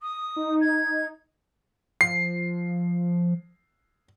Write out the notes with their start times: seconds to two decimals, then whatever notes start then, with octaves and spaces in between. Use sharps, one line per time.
0.01 D#6
0.36 D#4
0.60 G#6
2.01 F3 C7